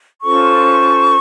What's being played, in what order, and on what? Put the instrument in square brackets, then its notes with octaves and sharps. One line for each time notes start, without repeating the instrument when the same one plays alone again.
[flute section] C#4 F4 A4 C5 C#6